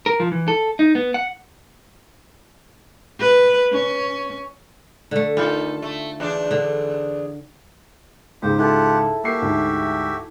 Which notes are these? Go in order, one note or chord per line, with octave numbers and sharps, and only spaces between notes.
A#4
F3
E3
A4
D#4
B3
F#5
B4
C#4
D3 A3
D#3 F4 A4
A3
E2 D4
D3
C#2 G#2 G4 C5
E4 F4 G4 A4 F#5 A5
A#3 F#4 G4 E5 C7
D2 G#2